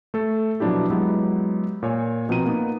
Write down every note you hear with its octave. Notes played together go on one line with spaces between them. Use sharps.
A3 A4
B2 F3 F#3 D4 E4 G4
F#3 G#3 B3 E4 G4
A#2 C#5 G#5
B2 F3 C4 A#5 D#7
A#3 B3 D#4